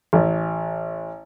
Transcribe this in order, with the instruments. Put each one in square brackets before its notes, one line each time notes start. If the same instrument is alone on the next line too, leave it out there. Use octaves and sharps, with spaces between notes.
[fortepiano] A1